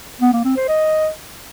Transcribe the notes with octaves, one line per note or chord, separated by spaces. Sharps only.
B3
A#3
C4
C5
D#5